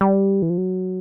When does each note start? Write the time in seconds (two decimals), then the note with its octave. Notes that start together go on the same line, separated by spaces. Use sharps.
0.01 G3
0.42 E3
0.50 F3
0.58 F#3